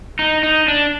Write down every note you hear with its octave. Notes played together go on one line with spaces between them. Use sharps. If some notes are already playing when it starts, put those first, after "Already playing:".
D#4
D#4
D4